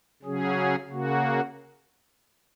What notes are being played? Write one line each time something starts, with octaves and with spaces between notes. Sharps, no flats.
C#3 F#3 C#4 G#4
C#3 A#3 F#4